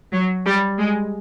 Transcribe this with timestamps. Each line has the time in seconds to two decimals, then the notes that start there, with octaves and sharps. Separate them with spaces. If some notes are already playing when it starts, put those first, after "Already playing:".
0.12 F#3
0.45 G3
0.77 G#3